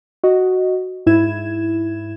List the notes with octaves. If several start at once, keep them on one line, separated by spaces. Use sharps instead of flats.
F#4 D#5
G#2 E4 G#6 E7